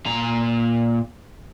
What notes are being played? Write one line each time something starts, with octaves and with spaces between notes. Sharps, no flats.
A#2 A#5